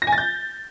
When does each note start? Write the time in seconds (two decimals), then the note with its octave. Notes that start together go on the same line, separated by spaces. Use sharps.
0.02 A#6
0.07 G#5
0.12 A6
0.18 G6